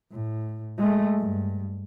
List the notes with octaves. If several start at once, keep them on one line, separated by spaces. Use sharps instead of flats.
A2
G#3 A3
G2